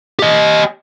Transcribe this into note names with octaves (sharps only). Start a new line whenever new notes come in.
G4 D#5